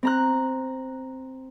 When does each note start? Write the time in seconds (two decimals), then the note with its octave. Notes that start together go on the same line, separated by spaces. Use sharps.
0.03 C4 A#5 F#6